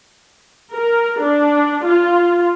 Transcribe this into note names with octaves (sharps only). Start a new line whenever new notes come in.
A#4
D4
F4